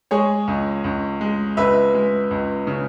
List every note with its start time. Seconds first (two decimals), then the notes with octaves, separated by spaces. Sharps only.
0.11 G#3 G#4 C#5
0.47 C#2
0.84 C#2
1.21 G#3
1.57 C#2 B4 E5
1.94 G#3
2.31 C#2
2.67 C#3